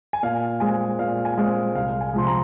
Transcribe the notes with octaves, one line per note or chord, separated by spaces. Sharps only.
G#5
A#2 F5
G#3 C4 G#5
A#2 F5
G#5
G#3 C4 F5
C2 F5
G#5
C3 F3 G#3 C6
A#5